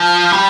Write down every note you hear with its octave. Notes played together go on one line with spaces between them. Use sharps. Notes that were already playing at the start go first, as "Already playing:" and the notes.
Already playing: F3
G3